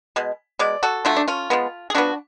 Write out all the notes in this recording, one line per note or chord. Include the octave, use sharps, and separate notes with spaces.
B2 G#3
B2 G#3 D5
F#4 A4
D3 F#3 A3 F4
D4
C#4 F4
F3 G#3 B3
G#4
D3 F3 B3 D4 F#4